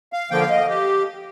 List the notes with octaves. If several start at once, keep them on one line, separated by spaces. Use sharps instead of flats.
F5
D3 F3 A#3 G5
F5
D#5
G4